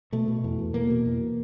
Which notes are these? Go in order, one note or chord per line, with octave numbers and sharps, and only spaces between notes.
B2 A3
B2
E2
E2
B2 A#3
B2
E2